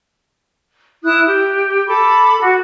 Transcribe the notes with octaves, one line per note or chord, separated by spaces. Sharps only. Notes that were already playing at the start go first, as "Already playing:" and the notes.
E4 D#6 F#6
G4
A4 B5 D6
F#4